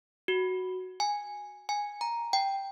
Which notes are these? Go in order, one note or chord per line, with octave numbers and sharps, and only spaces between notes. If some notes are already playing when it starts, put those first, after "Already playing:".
F#4
G#5
G#5
A#5
G5